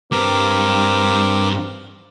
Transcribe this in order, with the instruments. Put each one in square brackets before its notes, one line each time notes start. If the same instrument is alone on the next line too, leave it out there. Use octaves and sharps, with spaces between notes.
[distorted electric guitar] G2 [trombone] C4 [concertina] A#4 D6